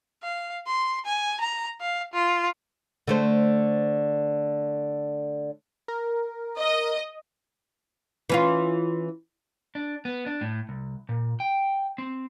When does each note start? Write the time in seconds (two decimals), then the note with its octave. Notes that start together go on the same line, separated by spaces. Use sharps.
0.23 F5
0.67 C6
1.06 G#5
1.41 A#5
1.81 F5
2.13 F4
3.07 D3 A3 C5
5.88 A#4
6.58 D#5
8.30 E3 C#4 F4
9.75 D4
10.05 B3
10.26 D4
10.41 A2
10.69 C2
11.09 A#2
11.40 G5
11.98 C4